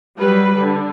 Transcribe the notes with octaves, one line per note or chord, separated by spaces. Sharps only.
F#3 G3 B4
D3